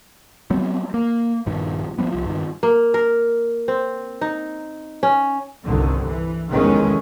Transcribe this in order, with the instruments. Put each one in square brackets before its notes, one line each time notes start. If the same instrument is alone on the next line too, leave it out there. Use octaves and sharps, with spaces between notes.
[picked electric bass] F#3 G3 B3 C4
A#3
A#1 G2 D#3
F3 G3 B3
C2 F3
G2 D#3
[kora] A#3
A#4
C4
D#4
C#4
[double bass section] G1 C2 D3 D#3
E3
F1 E2 D#3 G#3 A3 C#4